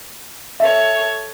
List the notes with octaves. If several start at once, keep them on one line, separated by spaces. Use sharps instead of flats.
A4 C#5 E5